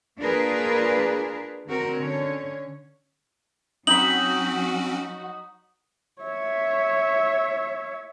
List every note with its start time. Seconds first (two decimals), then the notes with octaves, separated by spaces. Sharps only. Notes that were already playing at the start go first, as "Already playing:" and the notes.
0.18 A#3 D4 F4 G#4 A#4 B4
1.67 D3 C4 F#4 A#4
1.96 D3 C#4 C#5
3.87 F#3 C4 C#4 D#4 F#4 B5 F#7
6.22 C#5 E5